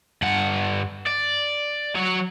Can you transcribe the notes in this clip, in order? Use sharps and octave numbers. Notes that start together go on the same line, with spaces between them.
G2 F#5
D5
F#3 C#5